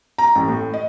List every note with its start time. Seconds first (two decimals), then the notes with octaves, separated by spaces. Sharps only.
0.18 A#5
0.35 A1
0.48 A2
0.74 D#5